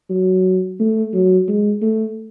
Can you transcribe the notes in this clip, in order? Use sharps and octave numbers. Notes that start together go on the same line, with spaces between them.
F#3
A3
F#3
G#3
A3